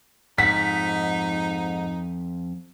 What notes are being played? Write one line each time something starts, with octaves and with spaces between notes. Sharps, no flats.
F2 G#2 D#4 F#5 B6